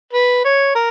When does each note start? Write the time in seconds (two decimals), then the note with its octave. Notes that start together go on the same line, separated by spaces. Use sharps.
0.13 B4
0.45 C#5
0.75 A#4